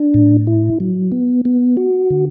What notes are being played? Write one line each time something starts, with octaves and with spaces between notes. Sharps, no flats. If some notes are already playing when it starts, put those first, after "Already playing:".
Already playing: D4
A2
E4
F#3
B3
B3
F#4
D3